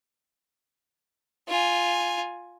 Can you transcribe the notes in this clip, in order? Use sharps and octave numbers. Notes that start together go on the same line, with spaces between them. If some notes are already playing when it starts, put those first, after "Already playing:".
F4 G#5